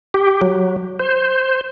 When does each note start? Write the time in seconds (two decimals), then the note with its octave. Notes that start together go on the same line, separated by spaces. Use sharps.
0.14 G4
0.41 F#3
0.99 C5